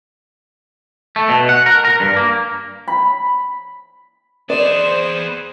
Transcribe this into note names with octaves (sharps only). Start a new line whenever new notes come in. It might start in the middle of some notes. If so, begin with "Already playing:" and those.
A3
B2
F#5
A#4
A#4
G2
A#3
B5
B3 G#4 C5 D5 E7